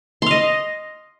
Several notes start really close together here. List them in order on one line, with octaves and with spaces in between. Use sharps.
C6 F5 D#5